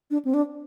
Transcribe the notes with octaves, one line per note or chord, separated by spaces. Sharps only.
D4
C4
D4